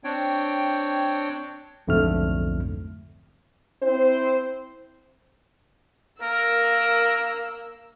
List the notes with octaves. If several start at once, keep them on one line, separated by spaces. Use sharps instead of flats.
C4 D4 C#5 G5
B1 F2 G#2 D3 A3 F6
C4 E4 C5
A#3 A#4 E6